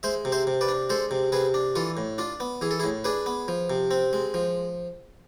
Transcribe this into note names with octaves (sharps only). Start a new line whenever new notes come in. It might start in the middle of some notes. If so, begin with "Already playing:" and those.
G#3 C5 E5
C3
C5 E5
C3
B4 D5
D4
G#3 A4 C5
C3
C3 G#4 B4
D4
E3 F4 A4
A2
D4 F4
B3
E3 G#4
A4
E4 G#4
A2
D4 G#4 B4
B3
F3
C3
C4
G#3
F3